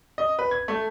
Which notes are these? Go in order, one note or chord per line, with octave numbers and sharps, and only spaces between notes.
D#5
B4
G#6
A3